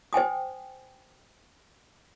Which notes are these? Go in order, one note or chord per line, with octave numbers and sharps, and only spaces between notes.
C5 G5 G#5 D#6